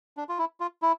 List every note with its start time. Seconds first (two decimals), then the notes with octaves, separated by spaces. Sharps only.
0.17 D4
0.29 F4
0.38 E4
0.60 F4
0.82 E4